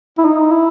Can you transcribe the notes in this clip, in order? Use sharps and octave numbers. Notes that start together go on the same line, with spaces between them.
E4
D#4
E4